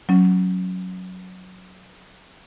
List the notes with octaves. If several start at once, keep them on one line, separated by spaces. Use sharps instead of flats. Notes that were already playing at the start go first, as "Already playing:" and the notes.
F#3 C#4